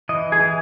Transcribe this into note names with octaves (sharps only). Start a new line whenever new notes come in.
E3 D#5
G#4
E3